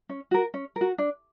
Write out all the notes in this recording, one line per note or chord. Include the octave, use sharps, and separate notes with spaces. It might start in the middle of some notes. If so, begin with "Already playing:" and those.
C#4
F#4 A#4
C#4
A#4
F#4
D4